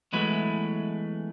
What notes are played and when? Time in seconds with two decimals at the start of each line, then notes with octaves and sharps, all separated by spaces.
0.13 E2 F#3 G#3 A3 E4 B4